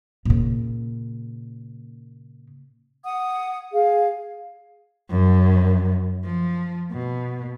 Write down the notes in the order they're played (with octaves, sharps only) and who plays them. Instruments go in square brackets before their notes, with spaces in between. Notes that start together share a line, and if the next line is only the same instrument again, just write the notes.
[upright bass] A#2 C#3
[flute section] F#5 D#6
G#4 F5
[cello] F#2
F3
B2